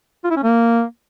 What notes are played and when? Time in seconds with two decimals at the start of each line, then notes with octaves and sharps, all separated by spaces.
0.24 F4
0.30 E4
0.37 C#4
0.43 A#3